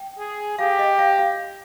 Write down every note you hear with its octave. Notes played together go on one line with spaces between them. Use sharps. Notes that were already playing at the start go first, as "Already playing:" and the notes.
Already playing: G5
G#4
G4 F5
D#5
F5
F5